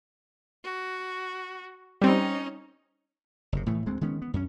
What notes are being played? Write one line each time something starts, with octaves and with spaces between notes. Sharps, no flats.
F#4
G3 C4 C#4 D#4
F#1 C3
A2 E3 A3
D2 G#3 C4
D#3 G#3 B3 C#4
B3
F#2 C#4